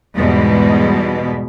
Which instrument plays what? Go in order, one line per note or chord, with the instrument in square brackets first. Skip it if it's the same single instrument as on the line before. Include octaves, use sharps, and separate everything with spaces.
[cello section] E2 G#2 B2 G3 G#3